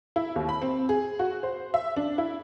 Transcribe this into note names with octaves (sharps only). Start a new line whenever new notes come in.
E4
D#2
B5
C4
G#4
F#4
C5
E5
D4
E4